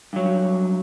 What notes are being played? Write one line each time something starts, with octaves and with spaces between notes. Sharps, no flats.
G2 F#3